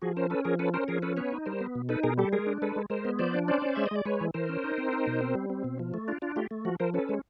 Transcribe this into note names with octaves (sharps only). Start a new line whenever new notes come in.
F3 F#4 G#4
C#4 A#4 C5
C#4 A4 B4
F3 G#4 A#4
C#4 A4 B4
C#4 A#4 C5
F3 G#4 A#4
C#4 A4 B4
B3 B4 C#5
D#4
G3 A#4 C5
B3
B2
D#4 A4 B4
B2 G#4 A#4
G3 G4 A4
G#3 G#4 A#4
D4
G#3 A4 B4
G#3
G#3 A#4 C5
B3
F3 C5 D5
D4
C#4 C5 D5
C#4
G#3 E5
D#5
G#3 D5
G#3 B4 C#5
E3
E3 A#4 C5
C#4
D#4
C4
D#4
B2
C4
G3
C4
B2
F3
A3
D4 F4
D4 F4
A3 F4 G4
A3
F3 F#4
F3 A#4 C5
C#4 A4 B4
G#3